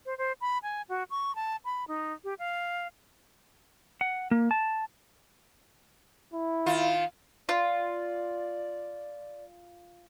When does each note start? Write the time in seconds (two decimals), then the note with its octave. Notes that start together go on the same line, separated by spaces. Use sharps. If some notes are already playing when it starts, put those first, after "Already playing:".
0.06 C5
0.18 C5
0.41 B5
0.63 G#5
0.89 F#4
1.10 C#6
1.35 A5
1.65 B5
1.88 D#4
2.24 G4
2.39 F5
4.01 F#5
4.31 A#3
4.51 A5
6.34 E4
6.66 D#3 F4
7.49 F4 D5